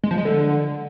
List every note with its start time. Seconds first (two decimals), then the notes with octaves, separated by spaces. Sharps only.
0.04 G#3
0.11 F3
0.18 G#3
0.25 D3